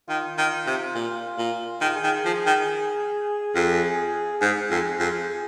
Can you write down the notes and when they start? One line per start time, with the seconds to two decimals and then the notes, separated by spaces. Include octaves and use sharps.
0.08 D#3 F4
0.38 D#3
0.66 C3
0.95 A#2
1.38 A#2
1.81 D#3 G#4
1.88 F4
1.96 G#4
2.03 D#3
2.25 F3
2.46 D#3
3.55 F2
4.41 G#2 G#4
4.70 F2
4.99 F2